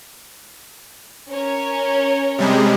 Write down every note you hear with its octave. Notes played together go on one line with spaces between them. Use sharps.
C#4 A#4 C#5
C3 G3 G#3